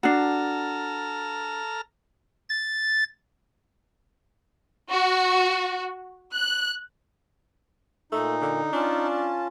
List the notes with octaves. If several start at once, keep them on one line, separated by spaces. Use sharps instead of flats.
D4 F#4 A4 A#5 F6
A6
F#4
F#6
A#2 A3 D#4
D3
C#4 D4 F4 A5